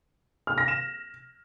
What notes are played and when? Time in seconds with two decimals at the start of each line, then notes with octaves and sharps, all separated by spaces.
0.47 F6
0.58 A#6
0.68 E7